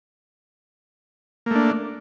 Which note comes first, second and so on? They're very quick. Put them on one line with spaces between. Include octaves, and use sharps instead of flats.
A#3 A3 D4